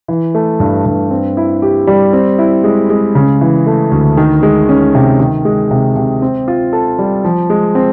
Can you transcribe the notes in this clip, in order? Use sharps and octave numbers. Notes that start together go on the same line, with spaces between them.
E3
A3
G2
G2
C4
E4
G4
G3
C4
E4
G#3
G#3
C#3
E3
A3
D2
D#3
G#3
C#4
C3
D#3
G#3
C3
C3
C4
F4
A4
G3
F3
G#3
C4